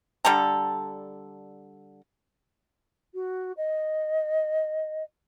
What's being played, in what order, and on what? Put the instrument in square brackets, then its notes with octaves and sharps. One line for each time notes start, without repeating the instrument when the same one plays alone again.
[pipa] D3 G3 A4 A#5
[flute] F#4
D#5